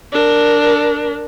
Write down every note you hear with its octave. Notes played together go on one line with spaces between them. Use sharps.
D4 A#4